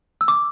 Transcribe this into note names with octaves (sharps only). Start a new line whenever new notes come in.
E6
D6